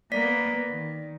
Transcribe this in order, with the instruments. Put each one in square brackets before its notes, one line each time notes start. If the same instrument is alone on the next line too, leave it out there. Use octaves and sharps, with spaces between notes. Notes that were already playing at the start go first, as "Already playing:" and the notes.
[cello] A#3 B3 [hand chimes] D5 B6
[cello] D#3